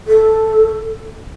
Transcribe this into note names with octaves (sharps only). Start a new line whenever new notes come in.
A4